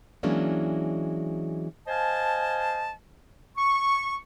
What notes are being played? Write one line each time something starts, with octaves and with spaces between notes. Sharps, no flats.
E3 F#3 G#3 A#3 C#4 D4
C5 D#5 F5 G#5 A5
C#6